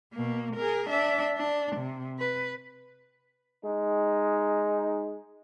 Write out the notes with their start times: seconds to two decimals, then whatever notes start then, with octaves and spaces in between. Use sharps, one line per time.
0.14 B2 A#3
0.56 G#4 A#4
0.90 D4 E5
1.36 D4
1.76 C3
2.19 B4
3.64 G#3 D#4